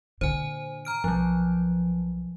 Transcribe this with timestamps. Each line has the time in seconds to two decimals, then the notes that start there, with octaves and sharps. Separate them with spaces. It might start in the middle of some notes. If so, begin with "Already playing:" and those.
0.21 A#2 D3 C5 G#5
0.85 A#5 F6 D7
1.04 B1 F3 F#3